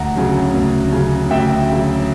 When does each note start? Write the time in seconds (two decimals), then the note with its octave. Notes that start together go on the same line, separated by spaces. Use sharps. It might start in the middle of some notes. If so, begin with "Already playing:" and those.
Already playing: D2 F#5 A#5
0.16 C#3 F#3
0.54 D2
0.92 C#3 F#3
1.31 D2 E5 G5
1.69 C#3 F#3